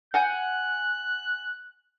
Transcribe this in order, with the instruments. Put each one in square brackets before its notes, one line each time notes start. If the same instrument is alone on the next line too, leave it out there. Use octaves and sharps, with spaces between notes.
[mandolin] F#5 G#5 G6 [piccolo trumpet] F#6